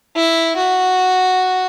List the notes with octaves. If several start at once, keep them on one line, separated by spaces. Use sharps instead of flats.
E4
F#4